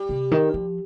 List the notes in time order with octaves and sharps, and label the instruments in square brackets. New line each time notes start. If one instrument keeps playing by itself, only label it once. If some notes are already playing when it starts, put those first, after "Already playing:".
Already playing: [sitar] G3
[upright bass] C3
D#3
F3